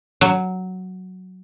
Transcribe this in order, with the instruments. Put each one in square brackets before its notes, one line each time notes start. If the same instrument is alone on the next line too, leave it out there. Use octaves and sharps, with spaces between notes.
[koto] F#3